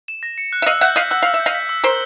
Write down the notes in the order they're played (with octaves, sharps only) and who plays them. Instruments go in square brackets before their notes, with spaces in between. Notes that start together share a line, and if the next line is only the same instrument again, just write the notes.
[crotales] E7
A#6
C#7
F#6
[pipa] E5
[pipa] D#5 F5 [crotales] E6
[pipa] E5 F#5 [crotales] G6
[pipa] D#5 F5 [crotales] B6
[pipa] F#5 [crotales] E6
[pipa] F5 [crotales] E6
[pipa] E5
[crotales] G6
[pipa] D#5 F5
[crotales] B6
E6
[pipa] A#4 C5 [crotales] G7